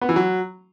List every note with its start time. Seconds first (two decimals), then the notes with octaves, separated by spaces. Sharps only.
0.02 B3
0.09 E3
0.16 F#3